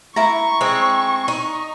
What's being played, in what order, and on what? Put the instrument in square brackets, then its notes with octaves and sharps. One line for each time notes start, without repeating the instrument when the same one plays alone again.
[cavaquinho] E4 A#5 [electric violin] C#6
[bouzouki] G#3 C4
D#4